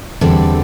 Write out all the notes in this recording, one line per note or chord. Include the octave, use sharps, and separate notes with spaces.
E2 D3 G3 C4 A4